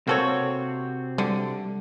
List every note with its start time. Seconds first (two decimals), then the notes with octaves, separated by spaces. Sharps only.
0.07 C3 A#3 C4 F#4 A4 C#5
1.18 D3 G3